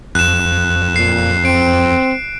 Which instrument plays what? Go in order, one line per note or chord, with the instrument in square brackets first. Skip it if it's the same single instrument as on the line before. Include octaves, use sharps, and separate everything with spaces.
[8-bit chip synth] F2 [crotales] F#6 E7
[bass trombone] A#2 [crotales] C7
[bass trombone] C4 [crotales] D7